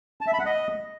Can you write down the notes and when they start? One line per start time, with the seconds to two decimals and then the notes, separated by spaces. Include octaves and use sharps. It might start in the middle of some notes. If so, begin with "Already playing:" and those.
0.21 A5
0.27 E5
0.33 B5
0.39 F#5
0.46 D#5